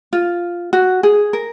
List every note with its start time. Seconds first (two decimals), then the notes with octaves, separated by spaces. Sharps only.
0.13 F4
0.73 F#4
1.03 G#4
1.33 A#4